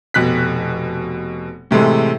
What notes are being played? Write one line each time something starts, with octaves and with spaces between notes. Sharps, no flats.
F1 B2 F#6 B6
A2 C3 E3 G#3 A4